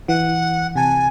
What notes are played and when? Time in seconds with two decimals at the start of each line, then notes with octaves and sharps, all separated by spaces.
0.08 E3 F#5
0.76 C3 G#5 A5